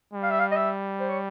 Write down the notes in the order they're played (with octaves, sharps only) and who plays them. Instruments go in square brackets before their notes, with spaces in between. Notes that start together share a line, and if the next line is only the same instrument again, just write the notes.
[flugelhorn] G3
[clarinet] F5
E5
F5
D#5
E5
C5
C#5